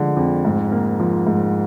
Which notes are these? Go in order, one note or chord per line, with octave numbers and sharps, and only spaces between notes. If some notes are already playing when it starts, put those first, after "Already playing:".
Already playing: D3 F3 G#3
F2
G#2
A#3
F3
G#2